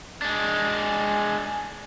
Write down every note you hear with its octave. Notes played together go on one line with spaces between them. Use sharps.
G#3 D4